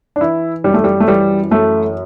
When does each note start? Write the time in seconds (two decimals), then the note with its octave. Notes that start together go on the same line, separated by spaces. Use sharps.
0.16 D4
0.21 E3 E4
0.64 F#2 G3
0.74 A3
0.84 G3
1.00 A3
1.08 E3 G3
1.51 F#2 A3